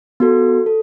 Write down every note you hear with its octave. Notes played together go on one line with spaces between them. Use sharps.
B3 F#4 A4
A4